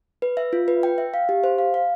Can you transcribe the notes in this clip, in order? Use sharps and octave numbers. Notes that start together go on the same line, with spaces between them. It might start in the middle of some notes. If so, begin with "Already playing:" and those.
B4
E5
F4
B4
G5
E5
F5
G4
C5
F5
F5